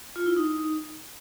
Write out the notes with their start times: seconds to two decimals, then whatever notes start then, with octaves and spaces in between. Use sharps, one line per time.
0.16 F4
0.26 E4
0.37 D#4